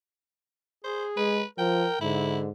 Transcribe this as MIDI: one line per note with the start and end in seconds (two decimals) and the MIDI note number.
0.84 1.35 68
0.84 1.05 72
1.17 1.43 56
1.17 1.45 71
1.58 1.87 53
1.58 1.99 70
1.58 2.00 79
2.01 2.51 44
2.01 2.49 50
2.01 2.38 64